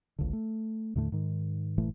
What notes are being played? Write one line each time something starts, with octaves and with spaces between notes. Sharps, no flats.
G#1 C#2 D3
A3
D#2 A2 D3 A3
G#2 D#3
F#1 A2 E3 A3